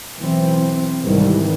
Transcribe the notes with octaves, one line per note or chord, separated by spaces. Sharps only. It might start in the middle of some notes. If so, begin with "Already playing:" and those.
B1 E3 C4
C2 G#2 D#3 E3 G3